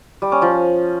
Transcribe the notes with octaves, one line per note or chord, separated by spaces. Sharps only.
G3
C#4
F3